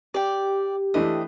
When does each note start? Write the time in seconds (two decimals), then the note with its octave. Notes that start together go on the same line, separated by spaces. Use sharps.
0.14 G4 D5 G5
0.94 E3 A3 D4 D#5